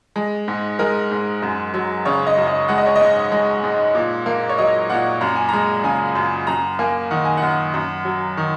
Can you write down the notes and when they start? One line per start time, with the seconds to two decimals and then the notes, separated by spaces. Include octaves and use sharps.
0.16 G#3
0.48 G#2
0.79 G#3 A#4
1.11 G#2
1.42 F#2
1.74 F#3
2.05 C#3 C#5
2.27 D#5
2.38 F#2
2.47 D#5
2.68 G#3 F#5
2.78 D#5
2.86 C#5
2.96 G#2 D#5
3.32 G#3
3.64 G#2
3.95 A#2
4.26 A#3
4.49 C#5
4.58 F#3 D#5
4.90 A#2 F#5
5.21 F#2 A#5
5.36 G#5
5.49 G#3 A#5
5.84 C#3 G#5
6.15 F#2
6.47 F#2 A#5
6.79 A#3 G#5
7.11 D#3 F#5
7.25 G#5
7.37 F#5
7.42 F#2
7.74 F#2
8.05 F#3
8.37 D#3